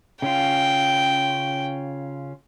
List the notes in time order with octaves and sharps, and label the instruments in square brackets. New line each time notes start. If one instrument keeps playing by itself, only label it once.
[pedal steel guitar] C#3 C#4 F4 [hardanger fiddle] G5